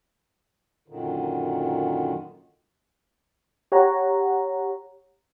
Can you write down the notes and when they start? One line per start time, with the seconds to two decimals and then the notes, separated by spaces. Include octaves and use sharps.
0.88 F#2 A#2 D3 D#3
3.72 G4 C#5 F#5 A#5